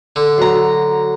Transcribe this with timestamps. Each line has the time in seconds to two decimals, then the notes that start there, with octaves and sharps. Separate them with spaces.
0.16 D3
0.38 F#3 A#5